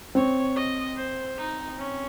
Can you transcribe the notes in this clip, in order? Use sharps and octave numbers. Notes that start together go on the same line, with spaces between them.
C4 C#5
D#5
C5
D#4
C#4